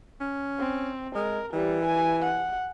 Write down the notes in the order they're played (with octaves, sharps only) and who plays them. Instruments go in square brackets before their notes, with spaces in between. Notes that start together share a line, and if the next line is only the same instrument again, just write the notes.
[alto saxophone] C#4
[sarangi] C4
[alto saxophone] G#3 [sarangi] A#4
[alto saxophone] E3 [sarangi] G3
[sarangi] G#5
F#5